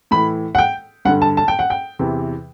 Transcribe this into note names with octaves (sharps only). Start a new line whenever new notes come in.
A2 E3 B5
F#5
G5
G2 D3 F#5
A5
A5
G5
F#5
G5
E2 C3 E3